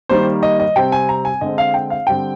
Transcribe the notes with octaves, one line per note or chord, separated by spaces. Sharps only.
D#3 G3 A#3 C5
D#5
D#5
C3 G3 C4 G5
G#5
A#5
G#5
D3 G#3 C4 D#5
F5
G5
F5
D3 G3 C4 G5